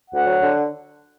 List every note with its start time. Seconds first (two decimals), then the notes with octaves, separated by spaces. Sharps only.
0.09 D2 F#5
0.26 F#3
0.43 D3